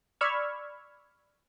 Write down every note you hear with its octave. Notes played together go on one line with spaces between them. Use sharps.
D5 B5 C#6 E6 F6 G#6